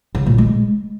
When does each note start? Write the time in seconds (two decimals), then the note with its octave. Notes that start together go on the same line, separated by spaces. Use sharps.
0.15 C#3
0.26 A#2
0.38 G#3